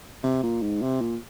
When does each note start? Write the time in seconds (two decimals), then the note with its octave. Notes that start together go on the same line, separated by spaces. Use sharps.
0.23 C3
0.43 A#2
0.62 G#2
0.82 C3
1.01 A#2